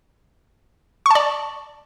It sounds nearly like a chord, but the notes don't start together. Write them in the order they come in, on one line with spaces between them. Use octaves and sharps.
C#6 A5 D5